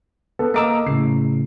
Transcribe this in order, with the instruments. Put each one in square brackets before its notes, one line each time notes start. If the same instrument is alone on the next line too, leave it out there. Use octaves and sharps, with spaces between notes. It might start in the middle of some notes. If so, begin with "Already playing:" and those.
[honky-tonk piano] B3 A4
[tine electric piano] A#3 D6 E6 [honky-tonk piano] A#4 D#5 A#5
[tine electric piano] A2 C#3 [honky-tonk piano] C7